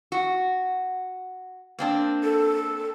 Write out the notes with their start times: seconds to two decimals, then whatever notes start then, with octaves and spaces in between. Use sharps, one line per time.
0.12 F#4
1.79 A#3 C4 D4
2.23 A4